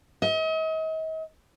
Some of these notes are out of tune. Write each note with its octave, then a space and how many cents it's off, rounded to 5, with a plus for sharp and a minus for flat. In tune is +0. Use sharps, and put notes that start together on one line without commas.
D#5 +40